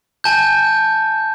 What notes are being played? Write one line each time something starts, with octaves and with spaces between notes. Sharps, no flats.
G#5 A5 G6